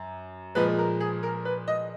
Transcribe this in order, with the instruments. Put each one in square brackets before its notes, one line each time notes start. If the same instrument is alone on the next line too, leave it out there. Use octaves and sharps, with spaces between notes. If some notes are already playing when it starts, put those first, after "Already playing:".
Already playing: [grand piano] F#2
A#2 F3 G#3 B4
A#4
G#4
A#4
B4
D#5